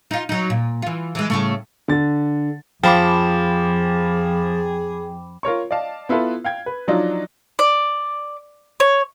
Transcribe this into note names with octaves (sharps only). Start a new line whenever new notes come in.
D#4 F4
F#3 D#4
A#2
E3 F4
E3 G#3
A2 C#3 A3
D3 A6
F2 F3 G#4 G5 B5 D6
F4 A#4 C#5 C#6
D5 D#5 F5 A5
B3 E4 F4 A4 B4
F5 G5 G#6
B4
F3 F#3 D4 D#4 F4
D5
C#5